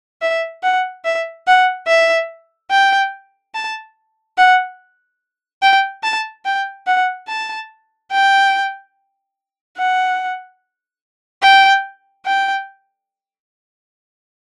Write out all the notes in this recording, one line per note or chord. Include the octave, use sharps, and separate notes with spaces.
E5
F#5
E5
F#5
E5
G5
A5
F#5
G5
A5
G5
F#5
A5
G5
F#5
G5
G5